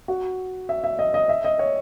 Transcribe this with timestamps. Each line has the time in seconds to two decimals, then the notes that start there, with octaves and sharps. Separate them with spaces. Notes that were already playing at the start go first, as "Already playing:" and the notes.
0.08 F#4
0.69 E5
0.84 E5
0.99 D#5
1.14 D#5
1.29 E5
1.44 D#5
1.59 C#5